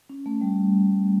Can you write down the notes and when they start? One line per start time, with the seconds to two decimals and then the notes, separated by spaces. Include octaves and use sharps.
0.10 C#4
0.26 A3
0.41 G3